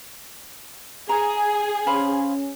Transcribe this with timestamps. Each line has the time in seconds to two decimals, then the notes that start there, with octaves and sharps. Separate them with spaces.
1.09 G#4 A#5
1.87 C#4 C5 F5 B5